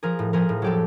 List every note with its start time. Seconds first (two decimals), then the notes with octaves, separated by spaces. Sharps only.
0.03 F3 G#4 A#4
0.19 A2
0.33 F3 G#4 A#4
0.49 A2
0.62 F#3 G4 A4